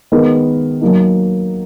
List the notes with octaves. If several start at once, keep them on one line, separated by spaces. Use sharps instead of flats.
D#3 G#3 B3 D#4 A#4
F#3 A#3 D#4